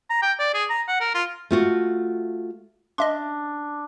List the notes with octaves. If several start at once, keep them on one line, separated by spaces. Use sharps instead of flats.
A#5
G5
D5
G#4
A#5
F#5
A#4
F4
A3 F4 F#4
D4 D#5 E5 C6